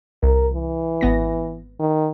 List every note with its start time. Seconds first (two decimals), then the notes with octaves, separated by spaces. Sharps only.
0.23 C2 A#4
0.53 E3
1.01 G#1 B3 A#6
1.80 D#3